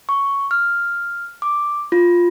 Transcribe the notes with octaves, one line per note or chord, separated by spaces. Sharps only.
C#6
F6
D6
F4